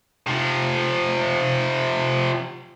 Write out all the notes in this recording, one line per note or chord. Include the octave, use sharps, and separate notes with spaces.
C3 F3